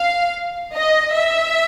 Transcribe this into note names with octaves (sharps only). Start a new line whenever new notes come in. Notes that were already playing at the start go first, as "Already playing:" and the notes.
Already playing: F5
D#5
E5